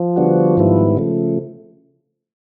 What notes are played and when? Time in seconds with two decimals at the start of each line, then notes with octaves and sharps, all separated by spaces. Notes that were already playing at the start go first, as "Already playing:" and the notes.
Already playing: F3
0.16 D3 G3 B3 D4 F#4
0.57 G#2 D#3 G3 B3 E4
0.97 C#3 F3 A3